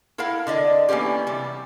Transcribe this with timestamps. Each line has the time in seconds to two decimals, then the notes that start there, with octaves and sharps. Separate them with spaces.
0.18 E4 A4 A#4 F5 F#5
0.47 D3 D5 D#5
0.89 E3 A#3 B3 C#4 G4
1.27 C3 G3